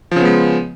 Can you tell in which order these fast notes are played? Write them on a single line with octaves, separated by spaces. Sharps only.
F3 C#3 B3 G#3